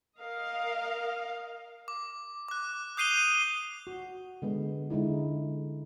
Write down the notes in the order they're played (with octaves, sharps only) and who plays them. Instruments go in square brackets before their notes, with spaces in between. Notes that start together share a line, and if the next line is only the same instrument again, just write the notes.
[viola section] A#4 D#5 F5
[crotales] D6
D6 F#6
D#6 G6 C7 D#7 F7 G7
[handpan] F#4
D3 G#3 B3
D3 G#3 D#4 E4